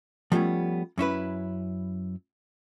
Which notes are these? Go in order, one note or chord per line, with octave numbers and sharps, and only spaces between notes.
F3 G3 A3 B3 C#4
F#2 C#4 E4 B4